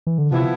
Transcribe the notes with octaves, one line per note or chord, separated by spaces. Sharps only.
E3
D3
C3 F3 B3 E4